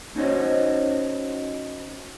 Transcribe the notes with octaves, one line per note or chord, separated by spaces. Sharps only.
C#4 D#4 F#4 C5 C#5 D#5